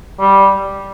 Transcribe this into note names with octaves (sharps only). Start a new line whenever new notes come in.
G3